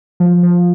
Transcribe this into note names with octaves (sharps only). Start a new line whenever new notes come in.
F3
F3